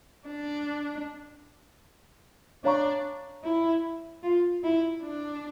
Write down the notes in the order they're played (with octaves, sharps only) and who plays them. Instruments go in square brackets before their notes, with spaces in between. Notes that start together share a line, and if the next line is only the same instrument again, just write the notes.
[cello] D4
[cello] D4 [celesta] C#5 F5 A#5 C#6
[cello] E4
F4
E4
D4